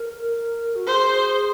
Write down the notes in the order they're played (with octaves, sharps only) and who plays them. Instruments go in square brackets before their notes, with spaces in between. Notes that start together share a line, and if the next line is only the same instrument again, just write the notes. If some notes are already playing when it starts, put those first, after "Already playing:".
Already playing: [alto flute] A#4
F#4
[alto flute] G#4 [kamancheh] C5